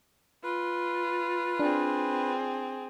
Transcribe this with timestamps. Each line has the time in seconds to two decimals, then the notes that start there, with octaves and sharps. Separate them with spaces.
0.44 F4 B4
1.59 C4 D4 G#4